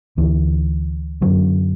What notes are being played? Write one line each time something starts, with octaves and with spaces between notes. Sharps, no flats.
D2 D3 E3
F#2 D3 F#3